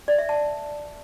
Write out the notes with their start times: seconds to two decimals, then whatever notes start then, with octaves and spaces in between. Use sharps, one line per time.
0.08 D5
0.18 E5
0.29 A5